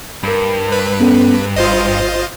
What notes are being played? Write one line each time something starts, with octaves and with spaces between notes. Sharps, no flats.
G2 A#4 B5
B4
B3 C#4 A4
G1 F4 C5 D#5